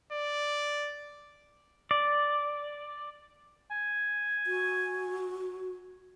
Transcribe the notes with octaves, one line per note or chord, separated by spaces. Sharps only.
D5
D5
G#5
F#4